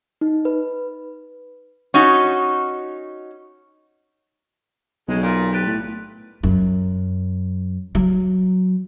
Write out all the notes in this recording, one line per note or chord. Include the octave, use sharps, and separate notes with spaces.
D#4
B4
C#4 D#4 F#4
B1 C#3 G#3
A#2
G4 B4 D5
A2
F#2
F#3